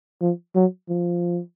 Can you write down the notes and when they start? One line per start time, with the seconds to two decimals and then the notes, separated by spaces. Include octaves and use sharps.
0.21 F3
0.55 F#3
0.89 F3